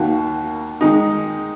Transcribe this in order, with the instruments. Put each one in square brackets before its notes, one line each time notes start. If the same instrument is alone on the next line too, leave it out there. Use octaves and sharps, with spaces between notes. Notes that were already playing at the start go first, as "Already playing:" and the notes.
Already playing: [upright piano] D#2 D#3 A#3 F#4
D#3 G#3 D#4